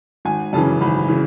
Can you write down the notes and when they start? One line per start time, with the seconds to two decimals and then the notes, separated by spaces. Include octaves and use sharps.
0.25 G#1 G#5
0.53 F#2 C#3 E3 A5
0.81 G#1 B5
1.08 C#3 E3